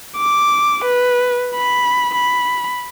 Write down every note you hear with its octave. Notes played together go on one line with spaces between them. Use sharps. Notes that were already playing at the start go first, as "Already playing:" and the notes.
D6
B4
B5
B5